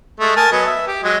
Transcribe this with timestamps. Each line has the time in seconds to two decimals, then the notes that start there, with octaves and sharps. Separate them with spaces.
0.20 G#3 A3
0.37 A#4 G#5 A5
0.52 F#3 B3 D#5
0.66 E5
0.87 G4
1.04 F#3 G#3 D#5